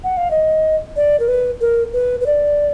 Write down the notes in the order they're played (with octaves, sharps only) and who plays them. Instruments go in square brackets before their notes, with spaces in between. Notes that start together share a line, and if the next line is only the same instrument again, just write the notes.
[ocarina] F#5
F5
D#5
D5
A#4
B4
A#4
B4
B4
D5